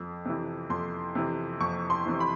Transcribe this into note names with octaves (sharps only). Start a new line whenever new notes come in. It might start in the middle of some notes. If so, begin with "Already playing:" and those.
Already playing: F2
C3 E3
F2 C6
C3 E3
F2 C#6
C6
C3 E3
B5